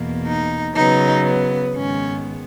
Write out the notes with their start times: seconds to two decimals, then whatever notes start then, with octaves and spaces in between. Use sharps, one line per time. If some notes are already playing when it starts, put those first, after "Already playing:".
Already playing: E2 B2 A#3
0.27 D#4
0.75 C#3 F#3 B3 D#4
1.25 B3
1.74 G#2 D#3 G#3 B3 C#4